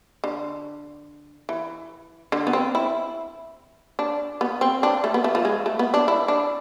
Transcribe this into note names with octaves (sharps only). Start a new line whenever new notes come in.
D3
E3
D3
B3
C4
E4
D4
B3
C4
D4
A3
B3
A3
F3
G#3
A3
B3
D4
E4
D4